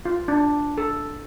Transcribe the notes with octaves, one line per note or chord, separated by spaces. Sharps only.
F4
D4
A4